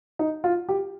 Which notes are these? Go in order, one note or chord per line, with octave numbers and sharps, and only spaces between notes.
D#4
F4
G4